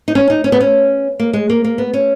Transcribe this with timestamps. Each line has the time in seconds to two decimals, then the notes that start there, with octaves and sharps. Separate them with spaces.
0.08 D#4
0.15 C#4
0.30 D#4
0.44 C#4
0.52 B3
0.60 C#4
1.19 A#3
1.33 G#3
1.50 A#3
1.64 A#3
1.78 B3
1.93 C#4